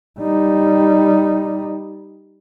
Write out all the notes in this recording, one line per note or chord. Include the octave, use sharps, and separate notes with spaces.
G3 D#4